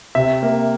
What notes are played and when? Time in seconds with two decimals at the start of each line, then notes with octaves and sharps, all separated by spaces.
0.15 C3 E5
0.43 A#3